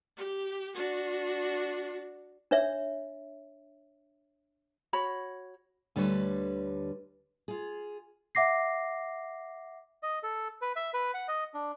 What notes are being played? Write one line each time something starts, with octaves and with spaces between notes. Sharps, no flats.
G4
D4 F#4
D4 C#5 E5
F#4 C#5 B5
D2 D3 G3 B4 C#5
F4 G#4
E5 F#5 D6 A#6 C7
D#5
A4
B4
E5
B4
F#5
D#5
D4